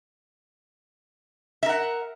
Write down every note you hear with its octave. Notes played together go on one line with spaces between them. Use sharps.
A#4 E5 F#5